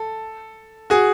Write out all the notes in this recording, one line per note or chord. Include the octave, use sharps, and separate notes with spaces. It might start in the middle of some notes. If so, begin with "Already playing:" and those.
Already playing: A4
F#4 G#4